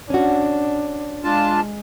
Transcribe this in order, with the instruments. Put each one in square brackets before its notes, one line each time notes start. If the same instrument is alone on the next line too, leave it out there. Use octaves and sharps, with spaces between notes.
[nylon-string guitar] C#4 F#4 [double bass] D4
[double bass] G#3 [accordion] D4 F4 A5